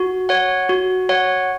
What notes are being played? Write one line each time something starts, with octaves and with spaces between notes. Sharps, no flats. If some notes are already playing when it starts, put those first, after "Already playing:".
Already playing: F#4
C#5 F#5
F#4
C#5 F#5